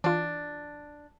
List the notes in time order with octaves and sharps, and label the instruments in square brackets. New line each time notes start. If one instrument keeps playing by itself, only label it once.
[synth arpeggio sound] E3 F4 [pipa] D4